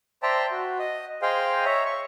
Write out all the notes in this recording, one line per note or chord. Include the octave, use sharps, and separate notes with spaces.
C5 D5 E5 G5 A5 A#5
F#4
D#5
G#4 C5 D#5 F5 G5
C#5 E5 A#5
C#6